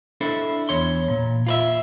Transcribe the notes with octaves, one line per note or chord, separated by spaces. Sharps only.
D4 E4 A4 C5
E2 C#5 C6
A#2
F4 B4 E5